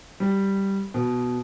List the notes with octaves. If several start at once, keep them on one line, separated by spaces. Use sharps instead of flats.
G3
B2